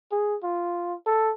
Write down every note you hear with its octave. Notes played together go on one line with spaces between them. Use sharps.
G#4
F4
A4